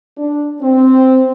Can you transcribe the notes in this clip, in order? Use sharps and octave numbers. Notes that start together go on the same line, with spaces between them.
D4
C4